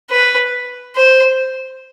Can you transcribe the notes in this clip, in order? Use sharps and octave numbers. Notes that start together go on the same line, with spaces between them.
B4
C5